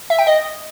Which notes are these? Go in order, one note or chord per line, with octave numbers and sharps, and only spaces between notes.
E5
G5
D#5